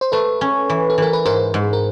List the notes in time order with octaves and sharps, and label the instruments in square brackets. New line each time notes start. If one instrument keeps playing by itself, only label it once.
[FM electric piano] C5
[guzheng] A3 [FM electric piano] A4 B4
[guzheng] C#4
E3
[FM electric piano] A4
[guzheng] E3 [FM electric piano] A#4
[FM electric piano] B4
[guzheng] G#2 [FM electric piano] A#4 C5
[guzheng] G#2
[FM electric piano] A#4